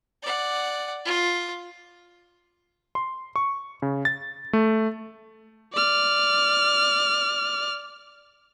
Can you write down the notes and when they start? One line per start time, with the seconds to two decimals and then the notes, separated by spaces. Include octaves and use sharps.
0.22 D5 F#5
1.05 F4
2.95 C6
3.36 C#6
3.82 C#3
4.05 A6
4.53 A3
5.74 D5 F6